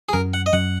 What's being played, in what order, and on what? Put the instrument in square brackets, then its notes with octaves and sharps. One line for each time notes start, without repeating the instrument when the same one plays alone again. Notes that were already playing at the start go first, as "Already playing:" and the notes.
[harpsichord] G#4
[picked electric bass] F#2 F#3 C#4 [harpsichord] A#4
[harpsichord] F#5
D#5
[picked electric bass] F#2 F#3 C#4 [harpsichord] F#5